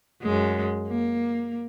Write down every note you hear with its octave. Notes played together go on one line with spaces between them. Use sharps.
F#2 G#3
A#3